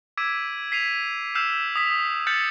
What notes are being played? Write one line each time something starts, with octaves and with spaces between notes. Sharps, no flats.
D6 E6 G#6 B6 D7 D#7
B6 C7 D#7 F7
E6 F6 G6 C7 E7 F7
D#6 B6
F6 G6 A6 B6 C#7 F#7